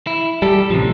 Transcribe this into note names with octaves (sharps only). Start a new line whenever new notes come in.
E4
G3 G4 A4
A1 C3 F3